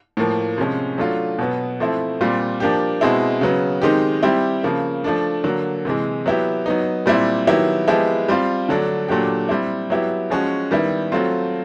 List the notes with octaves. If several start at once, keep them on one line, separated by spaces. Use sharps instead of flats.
A2 F3 A#3
C3 F3 G#3 C#4
F#3 A3 D4 F4
B2 F#3 B3
F3 A3 C4 E4
A#2 G3 C4 F4
F3 A#3 D4 G4
B2 G#3 C4 E4
C#3 F#3 B3
D#3 G#3 C4 D#4 G4
G3 C4 E4 G4
C#3 F3 A#3
F3 A3 D4
D3 F#3 A#3
C3 E3 G#3
F#3 B3 E4 G4
F#3 B3 D#4
A#2 G3 C4 E4
D#3 F#3 B3 E4 G4
F3 G#3 B3 E4 G4
G3 C4 F4
D3 F#3 A3 D4
A#2 F#3 A3 D4 G4
G3 C4 E4
F#3 B3 E4 G4
F3 G#3 C#4 F#4
D#3 G3 B3 E4
F#3 A3 C4 F4